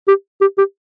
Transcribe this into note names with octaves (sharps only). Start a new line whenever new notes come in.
G4
G4
G4